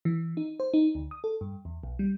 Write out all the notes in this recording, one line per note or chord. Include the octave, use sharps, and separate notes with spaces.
E3
D#4
C5
D#4
D2
D#6
A4
G2
E2
B1
G3